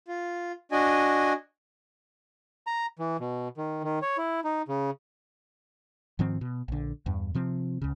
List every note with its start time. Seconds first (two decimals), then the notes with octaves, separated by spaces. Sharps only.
0.08 F4
0.72 D4 F#4 D#5 G#5
2.67 A#5
2.99 E3
3.20 B2
3.57 D#3
3.84 D#3
4.02 C#5
4.18 E4
4.44 D#4
4.68 C#3
6.19 G#2 D#3 F3 C4
6.41 B2
6.68 A#1 D3
7.06 E2 G2
7.35 C3 F3 C4
7.82 C#2 C#3